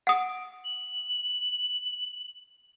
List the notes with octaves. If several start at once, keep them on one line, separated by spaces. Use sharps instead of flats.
F#5 D#6 D7
F#7